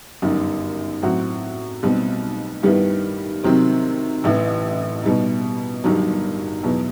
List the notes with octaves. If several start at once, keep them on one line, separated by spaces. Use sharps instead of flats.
G1 F#2 D#3
A2 F#3 C4 F#4
B1 B2 G3 C4
G2 D#3 G3 B3 E4
C3 D#3 F#3 C4
A1 A2 E3
B2 G3 D#4
G1 G2 D#3 F#3
E2 B2 F#3